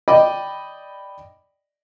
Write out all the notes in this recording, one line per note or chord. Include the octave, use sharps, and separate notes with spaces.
D5 D#5 G5 B5 D6